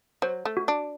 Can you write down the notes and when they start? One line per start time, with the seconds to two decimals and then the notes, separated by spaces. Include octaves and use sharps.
0.22 F#3 C5
0.45 A3
0.57 F#4
0.68 D4